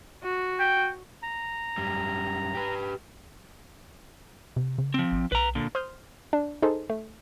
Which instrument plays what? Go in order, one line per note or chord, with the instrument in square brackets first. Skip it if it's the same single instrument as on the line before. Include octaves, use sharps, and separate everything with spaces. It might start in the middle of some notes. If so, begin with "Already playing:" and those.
[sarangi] F#4
[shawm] G5
[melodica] A#5
[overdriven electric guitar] F#2 G3
G4 B4
[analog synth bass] C3
C#3
[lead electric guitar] F3 C4
[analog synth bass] A1
[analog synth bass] B1 [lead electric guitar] B4 A#5
[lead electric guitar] A#2 D3
[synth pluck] C5 D#6 F6 G6
D4
D#4 G#4 A4 C5
A3